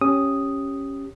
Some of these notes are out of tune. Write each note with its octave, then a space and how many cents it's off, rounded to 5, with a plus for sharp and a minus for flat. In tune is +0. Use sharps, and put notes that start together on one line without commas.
C#4 -10 G4 +0 D#6 +0